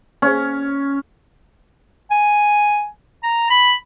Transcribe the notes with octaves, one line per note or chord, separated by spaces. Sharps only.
C#4
G#5
A#5
B5